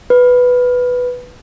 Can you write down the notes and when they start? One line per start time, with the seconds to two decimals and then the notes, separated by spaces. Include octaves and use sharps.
0.10 B4